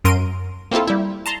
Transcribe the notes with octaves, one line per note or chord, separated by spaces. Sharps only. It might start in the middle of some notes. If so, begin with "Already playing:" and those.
F#2 A#4 C6 D7 D#7
A#3 C4 E4 F4 A4
G3 E4
A5 A#5 C6